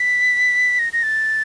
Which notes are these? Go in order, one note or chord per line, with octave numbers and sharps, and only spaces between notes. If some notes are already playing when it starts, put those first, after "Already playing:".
Already playing: B6
A#6
A#6
A6